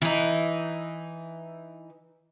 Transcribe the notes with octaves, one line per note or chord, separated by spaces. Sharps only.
E3 D#4